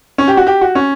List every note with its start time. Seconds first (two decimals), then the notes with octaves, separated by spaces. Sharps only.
0.18 C#4
0.28 G4
0.37 F#4
0.47 G4
0.61 F#4
0.75 C#4